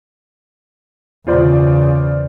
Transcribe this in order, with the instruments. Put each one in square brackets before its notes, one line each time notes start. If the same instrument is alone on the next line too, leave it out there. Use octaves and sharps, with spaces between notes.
[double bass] E2 C#3 [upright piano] F4 C5 D5